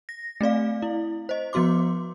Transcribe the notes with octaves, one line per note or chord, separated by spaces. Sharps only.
A#6
A3 C4 D5 F5
E4
C5 D#5
F3 B3 F#4 C6 D6